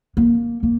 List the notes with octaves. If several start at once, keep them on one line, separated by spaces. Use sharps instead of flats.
A#3
A#3